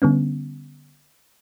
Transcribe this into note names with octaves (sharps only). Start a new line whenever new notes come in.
D3 G3 B3 C#4